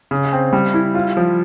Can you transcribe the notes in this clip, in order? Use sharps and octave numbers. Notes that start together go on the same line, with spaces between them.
C#3
C4
G3
E4
F4
F3